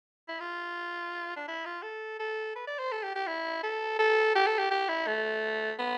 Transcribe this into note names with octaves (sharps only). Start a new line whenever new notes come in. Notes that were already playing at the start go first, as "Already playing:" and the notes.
E4
F4
D4
E4
F4
A4
A4
B4
D5
C5
A4
G4
G4
E4
A4
A4
G4
A4
G4
G4
E4
A3
B3